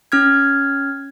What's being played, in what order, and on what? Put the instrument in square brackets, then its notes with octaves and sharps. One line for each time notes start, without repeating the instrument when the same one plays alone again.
[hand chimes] C#4 F6 G#6